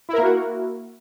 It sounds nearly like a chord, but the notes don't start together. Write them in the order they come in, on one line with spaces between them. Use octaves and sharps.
E4 A#4 A#3 F#4